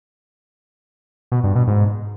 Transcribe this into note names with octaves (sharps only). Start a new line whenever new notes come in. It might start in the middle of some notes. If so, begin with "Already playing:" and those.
B2
G2
B2
G#2